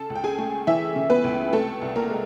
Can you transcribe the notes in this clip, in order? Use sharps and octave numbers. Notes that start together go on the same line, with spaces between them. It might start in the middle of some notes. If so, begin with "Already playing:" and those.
Already playing: C#3 A4 A5
C#2
G5
G#4 G#5
A3
E3 E4 E5
C#3
B3 B4
C#2
C3 A3 A4
C2
A#3 A#4
G#3